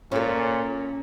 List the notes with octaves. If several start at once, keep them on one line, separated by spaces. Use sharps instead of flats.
A#2 C#4 A4